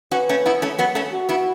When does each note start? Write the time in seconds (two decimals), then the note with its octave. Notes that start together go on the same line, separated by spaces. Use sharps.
0.11 C#4 F#4 B4
0.29 A3 C#4
0.46 B3 E4
0.62 A3 C#4
0.78 F#3 B3
0.95 A3 C#4
1.12 F#4
1.29 B3 E4